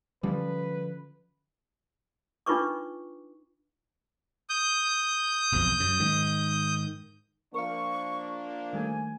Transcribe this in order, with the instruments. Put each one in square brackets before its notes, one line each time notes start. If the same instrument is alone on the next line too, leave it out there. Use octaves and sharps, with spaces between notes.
[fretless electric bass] D3 F3 C#4 [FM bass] G3 [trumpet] B4
[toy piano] D4 D#4 F4 B4 C#6 D6
[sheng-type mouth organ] D#6 G6
[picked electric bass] F#1 B1 F2
F#2
G#2 D#3
[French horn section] F3 A#3 D4 [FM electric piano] A#4 F5 [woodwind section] C#6
[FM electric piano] D#3 G3 A3 [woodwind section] G#5